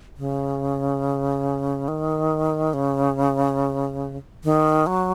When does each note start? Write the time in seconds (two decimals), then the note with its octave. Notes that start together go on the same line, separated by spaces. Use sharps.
0.17 C#3
1.88 D#3
2.74 C#3
4.44 D#3
4.87 F#3